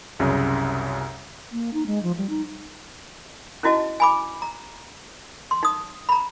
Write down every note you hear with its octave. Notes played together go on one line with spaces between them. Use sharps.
C2 F#2 C#3
A#3
D#4
G#3
F3
G3
D#4
C#4 D#4 E4 F#4 D#5 A5
G#5 B5 D6
A#5
C6
D#4 D#6
A#5 B5